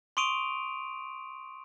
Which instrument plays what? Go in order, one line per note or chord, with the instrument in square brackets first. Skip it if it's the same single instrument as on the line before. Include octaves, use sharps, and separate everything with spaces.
[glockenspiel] C6 C#6 D#6 D7 D#7 F7